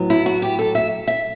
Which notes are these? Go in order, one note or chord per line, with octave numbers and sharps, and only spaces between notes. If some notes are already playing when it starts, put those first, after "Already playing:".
Already playing: A2 F#3 B3
E4
F#4
G4
A4
E5
E5